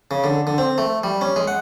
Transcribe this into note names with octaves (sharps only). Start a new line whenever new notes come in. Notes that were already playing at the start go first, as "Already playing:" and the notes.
C#3
D3
D3
C4
A3
G3
C#4
G#3
F#5